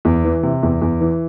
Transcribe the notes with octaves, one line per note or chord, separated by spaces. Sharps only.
E2
E3
C3
E2
E2
E3